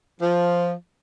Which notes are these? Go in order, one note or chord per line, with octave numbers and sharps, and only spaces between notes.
F3